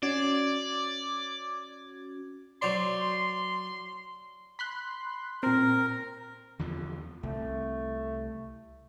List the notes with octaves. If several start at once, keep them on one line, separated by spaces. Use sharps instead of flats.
C#4 F#4 D5 G#6
F#3 C5 D5 C6
B5 C6 F#6
A#2 C4 A#4
E2 D3 F3
C2 A3